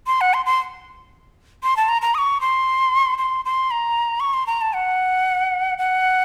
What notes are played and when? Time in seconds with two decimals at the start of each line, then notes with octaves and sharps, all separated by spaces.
0.07 C6
0.21 F#5
0.34 C6
0.46 C6
1.63 C6
1.77 A5
1.89 A#5
2.02 A#5
2.15 D#6
2.18 C#6
2.41 C6
3.18 C6
3.45 C6
3.71 A#5
4.20 C#6
4.34 C6
4.47 A#5
4.61 A5
4.74 F#5
5.78 F#5